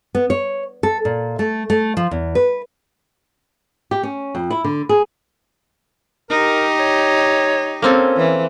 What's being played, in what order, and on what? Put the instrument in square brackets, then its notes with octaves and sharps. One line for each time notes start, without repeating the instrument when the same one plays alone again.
[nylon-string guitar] B3
C#5
A4
A#2
A3
A3
F3
E2
B4
G4
C#4
F2
E4
D3
G#4
[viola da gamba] D#4 G4 [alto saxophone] A#4
[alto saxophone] C#5
[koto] A#3 C4 A4 [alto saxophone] C#4
[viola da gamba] E3